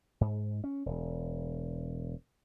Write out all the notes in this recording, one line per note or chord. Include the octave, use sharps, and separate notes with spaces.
G#2
C#4
E1